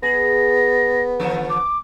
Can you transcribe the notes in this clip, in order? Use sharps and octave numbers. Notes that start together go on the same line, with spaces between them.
B3 G#4 A#6
D3 F3 A4
D6